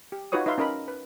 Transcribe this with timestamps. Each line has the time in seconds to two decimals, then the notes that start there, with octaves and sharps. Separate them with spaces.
0.12 G4
0.32 D#4 F4 F#4 B4 C#5 D#6
0.46 D#4 B4 E5 F5 C6
0.58 C#4 D#4 A#4 D#5 B5
0.88 B4